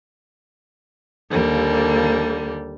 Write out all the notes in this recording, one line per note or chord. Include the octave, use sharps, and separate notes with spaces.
D#2 D3 G3 A#3